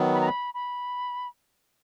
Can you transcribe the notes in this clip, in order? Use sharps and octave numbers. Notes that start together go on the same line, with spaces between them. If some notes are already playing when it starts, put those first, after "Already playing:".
Already playing: D#3 F#3 B3
B5
A#5
B5
B5